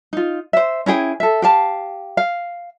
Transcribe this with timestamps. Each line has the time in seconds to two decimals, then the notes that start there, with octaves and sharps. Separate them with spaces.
0.13 D#4 F4
0.53 C5 E5
0.86 C#4 E4 G#4 G5
1.20 A4 E5
1.42 G4 F5 A5
2.17 F5